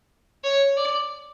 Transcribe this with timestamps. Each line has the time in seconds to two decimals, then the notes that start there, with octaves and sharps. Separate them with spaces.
0.44 C#5
0.77 D5